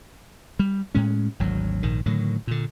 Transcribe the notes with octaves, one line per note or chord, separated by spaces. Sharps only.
G3
A2 G#3 C#4
G#1 D2 F#3
A#1 G#2 D#3
A2 D3 D#3 F#3
A#2 D3